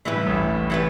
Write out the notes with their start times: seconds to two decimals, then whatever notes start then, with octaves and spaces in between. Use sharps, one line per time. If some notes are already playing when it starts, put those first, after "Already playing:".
0.05 A2 E3 G3 E4 B4
0.16 G2
0.27 A1 A2
0.70 E3 G3 E4 B4